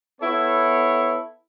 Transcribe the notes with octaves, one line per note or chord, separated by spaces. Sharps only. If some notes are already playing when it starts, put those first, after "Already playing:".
B3 E4 A4 C#5